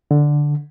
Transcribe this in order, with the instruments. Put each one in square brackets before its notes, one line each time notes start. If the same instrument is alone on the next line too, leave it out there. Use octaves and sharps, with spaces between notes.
[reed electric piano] D3